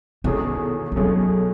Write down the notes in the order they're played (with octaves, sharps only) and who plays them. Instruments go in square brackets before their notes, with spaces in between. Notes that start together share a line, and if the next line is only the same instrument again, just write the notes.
[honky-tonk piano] E2 B2 A3 C#4 G#4 [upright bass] D#3
[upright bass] E3
[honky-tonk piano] B2 A3 C#4 G#4 [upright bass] F#3